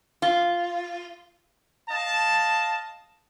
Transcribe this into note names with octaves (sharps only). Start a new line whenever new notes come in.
F4
D#5 F5 A5